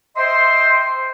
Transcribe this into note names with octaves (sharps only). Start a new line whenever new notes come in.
C5 D#5 E5 G5 C6